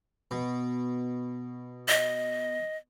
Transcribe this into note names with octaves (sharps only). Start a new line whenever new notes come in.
B2
D#5